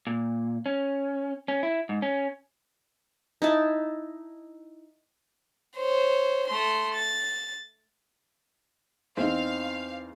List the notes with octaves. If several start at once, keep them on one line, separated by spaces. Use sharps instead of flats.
A#2
C#4
C#4
E4
G#2
C#4
D#4 E4 A5
C5 C#5
A3 C6
A6
E2 C4 D#4 F5